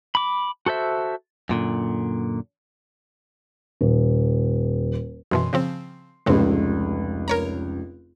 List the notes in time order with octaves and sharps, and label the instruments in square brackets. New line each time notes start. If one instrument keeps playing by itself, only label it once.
[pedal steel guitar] B5 D6
F#4 A4 C5 E5
[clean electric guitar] F#2 A#2 D3
[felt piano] D#1
[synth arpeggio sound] F#2 B2 E3 [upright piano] C6
[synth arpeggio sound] C#3 F3 C4
[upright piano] F1 C#2 [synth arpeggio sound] A2 C#3 C4
[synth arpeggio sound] A#4 C#5 A#5